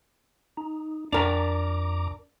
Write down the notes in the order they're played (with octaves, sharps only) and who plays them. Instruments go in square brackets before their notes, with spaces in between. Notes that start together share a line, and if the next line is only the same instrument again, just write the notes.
[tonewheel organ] D#4
[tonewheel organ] F2 A#5 D6 [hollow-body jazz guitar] D4 A#4